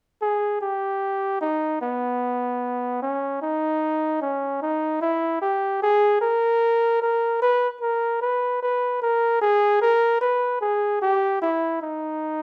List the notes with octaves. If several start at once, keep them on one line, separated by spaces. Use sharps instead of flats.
G#4
G4
D#4
B3
C#4
D#4
C#4
D#4
E4
G4
G#4
A#4
A#4
B4
A#4
B4
B4
A#4
G#4
A#4
B4
G#4
G4
E4
D#4